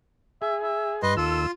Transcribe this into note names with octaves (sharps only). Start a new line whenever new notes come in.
G#4 E5
E5
G2 B4 D#5 C6
D#2 F4 A4 E6